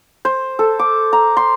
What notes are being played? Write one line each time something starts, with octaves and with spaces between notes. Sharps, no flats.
C5
A4
D6
A#5
C6